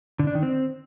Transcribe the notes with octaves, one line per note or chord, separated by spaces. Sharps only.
D3
D4
D#3
C4